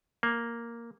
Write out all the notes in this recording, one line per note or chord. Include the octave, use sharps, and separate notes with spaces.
A#3